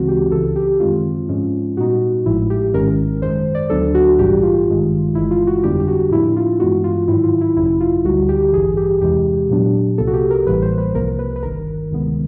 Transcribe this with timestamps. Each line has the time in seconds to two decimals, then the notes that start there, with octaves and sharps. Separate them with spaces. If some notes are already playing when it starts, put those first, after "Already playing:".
Already playing: D2 C#3 E3 G#3 C4 F#4
0.08 G4
0.32 C#2 C#3 E3 A4
0.56 G4
0.80 F#2 D#3 G#3 C4 F4
1.29 G#2 F3 G#3 C#4
1.77 A#2 G3 B3 D#4 F#4
2.26 A1 A2 F3 G#3 E4
2.50 G4
2.73 G#1 G#2 D#3 G#3 C#4 A#4
3.21 F#2 D#3 G#3 C5
3.55 D5
3.70 D2 D3 F#3 B3 D4 A4
3.95 F#4
4.19 A#1 G#2 E3 G3 G4
4.43 F4
4.66 G#1 G2 D#3 G#3
5.15 G1 G2 E3 G#3 E4
5.31 F4
5.47 F#4
5.63 F2 D3 G3 B3 D4 G4
5.80 G4
5.88 F#4
6.11 A2 F3 A#3 D4 E4
6.36 F4
6.60 G2 E3 G#3 B3 F#4
6.84 F4
7.08 G#2 D#3 F#3 E4
7.24 F4
7.41 E4
7.56 G#1 F#2 C#3 F#3 E4
7.80 F4
8.04 D2 D3 G3 F#4
8.29 G4
8.53 A1 G2 E3 G#4
8.77 G4
9.01 E2 C3 E3 G#3 G4
9.49 A#2 F#3 B3 D4
9.98 C2 C3 F3 A#3 A4
10.07 F#4
10.14 G4
10.30 A#4
10.46 A1 A2 E3 G3 A#3 B4
10.62 C5
10.78 B4
10.94 C2 C3 F3 A#3 A#4
11.19 B4
11.36 B4
11.43 G1 G2 D#3 A#4
11.91 D2 C3 D#3 G#3 B3